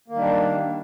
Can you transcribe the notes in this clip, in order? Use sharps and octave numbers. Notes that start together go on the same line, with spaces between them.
D#3 G3 A#3 D4